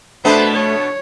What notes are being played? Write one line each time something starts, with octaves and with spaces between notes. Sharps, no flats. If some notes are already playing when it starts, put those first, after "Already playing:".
B2 A3 B3 D4 B4 C5
C#5